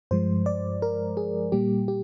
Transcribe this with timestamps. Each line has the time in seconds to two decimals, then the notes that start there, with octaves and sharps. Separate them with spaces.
0.11 G2 F3 G#3 C5
0.46 D5
0.82 A#4
1.17 G#4
1.52 A#2 G3 A#3 G4
1.88 G4